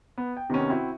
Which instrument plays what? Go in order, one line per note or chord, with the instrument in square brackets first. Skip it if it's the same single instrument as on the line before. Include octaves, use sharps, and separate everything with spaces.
[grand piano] B3
G5
C3 D#3 B3 C#4
C4 E4 F#4